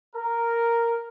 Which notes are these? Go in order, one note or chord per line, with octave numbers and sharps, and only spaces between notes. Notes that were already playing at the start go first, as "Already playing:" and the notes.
A#4